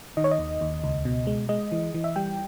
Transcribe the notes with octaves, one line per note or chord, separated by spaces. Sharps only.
D#3 D#5
C#5
D#5
D#2
D#2
C#2
B2
G#3
G#3 D#5
E3
E3
E5
G3 G5